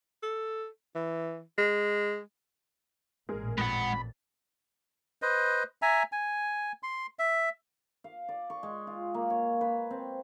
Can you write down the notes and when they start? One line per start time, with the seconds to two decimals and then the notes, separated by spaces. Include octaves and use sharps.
0.23 A4
0.95 E3
1.58 G#3
3.29 A1 A#2 G#3 G#4 A#4
3.58 F2 G#3 F#5 B5 D#6 A6
5.22 B4 C5 D#5
5.82 E5 G#5 A#5
6.12 G#5
6.83 C6
7.19 E5
8.04 F5
8.29 D5
8.50 C#6
8.63 G#3
8.87 F4
9.14 A#3
9.30 C#5
9.61 B4
9.91 C4